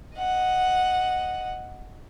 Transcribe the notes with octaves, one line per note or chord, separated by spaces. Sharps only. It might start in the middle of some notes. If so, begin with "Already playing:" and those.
D#5 F#5